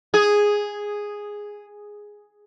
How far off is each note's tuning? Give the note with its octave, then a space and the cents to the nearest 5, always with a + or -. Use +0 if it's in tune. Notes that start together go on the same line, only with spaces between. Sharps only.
G#4 -5